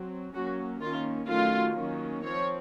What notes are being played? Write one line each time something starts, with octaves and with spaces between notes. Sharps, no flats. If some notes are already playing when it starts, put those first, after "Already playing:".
Already playing: F#3 C4
F#3 A#3 C#4 F#4
D#3 A#3 C#4 F4
D#3 F#3 A3 C#4 F4
D#3 F#3 A#3 C#4
F3 C4 C#5